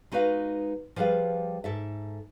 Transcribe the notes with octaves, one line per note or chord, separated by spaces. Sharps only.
G#3 D#4 F#4 B4 F5
F3 G3 G#4 B4 F5
G#2 A4 E5